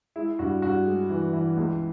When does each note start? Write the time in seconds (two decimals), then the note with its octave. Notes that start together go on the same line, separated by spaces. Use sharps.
0.16 G#3 E4
0.39 G2 F#4
0.62 G2 F#4
0.86 G#3
1.09 E3
1.33 E3
1.57 C#2